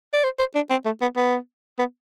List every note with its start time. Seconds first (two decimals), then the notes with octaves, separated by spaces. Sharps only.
0.13 D5
0.24 C5
0.39 C5
0.55 D4
0.70 C4
0.85 A3
1.01 B3
1.17 B3
1.79 B3